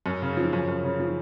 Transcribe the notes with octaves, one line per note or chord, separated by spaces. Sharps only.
F#2
C#3
F3
F#2
F#2
C#3
F3